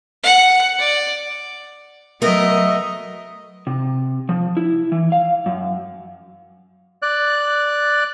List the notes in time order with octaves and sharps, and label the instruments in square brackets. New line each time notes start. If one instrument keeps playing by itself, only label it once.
[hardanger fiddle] F#5
D5
[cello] F#3 [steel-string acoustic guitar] A3 B3 A#4 [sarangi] D#5
[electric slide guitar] C3
F3
E4
E3
F5
F#2
[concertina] D5 F#6